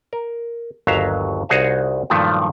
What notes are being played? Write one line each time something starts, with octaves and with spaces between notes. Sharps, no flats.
A#4
G1 D#2 F#3 E5 F5 A#5
C2 D#4 F#4 G#4 C#5 F5
G2 A#2 D#3 F3 F#3 A3